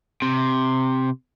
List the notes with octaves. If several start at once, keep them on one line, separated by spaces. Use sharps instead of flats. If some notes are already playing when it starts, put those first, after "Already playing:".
C3